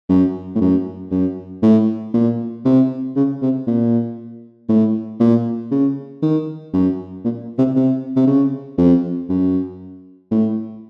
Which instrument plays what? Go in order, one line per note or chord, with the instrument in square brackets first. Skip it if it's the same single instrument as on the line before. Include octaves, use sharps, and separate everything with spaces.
[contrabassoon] F#2
A2
F#2
F#2
A2
A#2
C3
C#3
C3
A#2
A2
A#2
C#3
D#3
F#2
A#2
C3
C3
C3
C#3
F2
F#2
A2